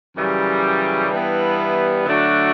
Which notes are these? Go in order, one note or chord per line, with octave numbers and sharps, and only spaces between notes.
F#2 C#3 E3 G3
G2 E3 G3 B3 E4
D3 F#3 A3 D4 F#4